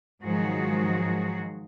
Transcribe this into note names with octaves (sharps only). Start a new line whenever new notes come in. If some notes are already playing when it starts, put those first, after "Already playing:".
G#2 D#3 F3 F#3 F#4 G#4